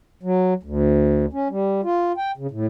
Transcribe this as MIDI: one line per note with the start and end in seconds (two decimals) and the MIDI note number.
0.23 0.54 54
0.63 1.26 38
1.33 1.48 61
1.50 1.81 55
1.84 2.12 65
2.17 2.31 79
2.37 2.47 49
2.51 2.67 45